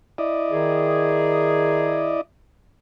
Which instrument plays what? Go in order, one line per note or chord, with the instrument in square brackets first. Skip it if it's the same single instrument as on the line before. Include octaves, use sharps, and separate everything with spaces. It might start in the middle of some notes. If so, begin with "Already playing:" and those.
[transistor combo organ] E4 D5 D#5
[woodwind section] D#3 G#4